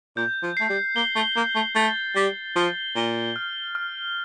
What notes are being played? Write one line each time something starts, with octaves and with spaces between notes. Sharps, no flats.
A#2 G6
F3
A3 C7
G3
A#3 G7
A3
A#3 G6
A3
A3 A6
G3 A6
F3 G7
A#2 G7
F6
F6